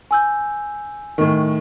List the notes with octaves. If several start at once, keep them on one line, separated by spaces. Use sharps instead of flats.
G#5 E6 G6
A2 D#3